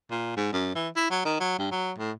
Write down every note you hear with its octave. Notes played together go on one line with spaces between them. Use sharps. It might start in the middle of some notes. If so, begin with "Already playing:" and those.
A#2
G#2
F#2
E3
E4
F#3
D#3
F#3
G2
F#3
A2